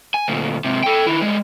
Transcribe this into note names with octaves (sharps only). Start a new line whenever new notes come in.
G#5
D2 A#2
G#2 C3
A4 G5
D#3 E4
G3 G#3